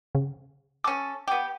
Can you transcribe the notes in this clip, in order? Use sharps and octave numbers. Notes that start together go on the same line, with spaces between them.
C#3
C#4 A4 D6
B3 G4